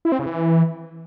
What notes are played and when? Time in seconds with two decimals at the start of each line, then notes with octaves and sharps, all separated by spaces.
0.05 E4
0.12 C4
0.19 C#3
0.26 E3